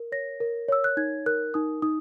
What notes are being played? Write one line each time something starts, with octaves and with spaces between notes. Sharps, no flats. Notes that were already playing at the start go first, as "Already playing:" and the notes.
Already playing: A#4
C#5 A#6
A#4
C#5 E6
F#6
D#4 G#6
A#4 F#6
D#4 D#6
D#4 D#6